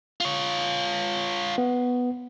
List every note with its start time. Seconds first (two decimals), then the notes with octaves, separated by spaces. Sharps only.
0.20 F4 C#5
1.58 B3